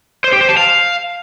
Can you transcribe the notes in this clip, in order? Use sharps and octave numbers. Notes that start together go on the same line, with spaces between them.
C5
G4
C5
A5
F5